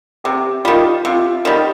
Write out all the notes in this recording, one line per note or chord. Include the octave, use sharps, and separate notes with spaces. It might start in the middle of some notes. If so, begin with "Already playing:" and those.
C3 G4
D#3 G3 F4
C3 F4
D#3 G3